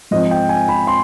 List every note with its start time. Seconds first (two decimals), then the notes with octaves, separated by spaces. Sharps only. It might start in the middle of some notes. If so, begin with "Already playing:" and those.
0.11 G#2 F3 C4 D#5
0.31 G5
0.49 G#5
0.68 B5
0.87 C6